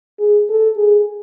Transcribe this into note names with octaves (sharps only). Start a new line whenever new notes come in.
G#4
A4
G#4